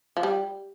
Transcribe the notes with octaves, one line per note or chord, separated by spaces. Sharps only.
F3
G3